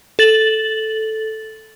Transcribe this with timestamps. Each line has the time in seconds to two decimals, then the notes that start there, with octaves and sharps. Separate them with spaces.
0.19 A4 A6 F#7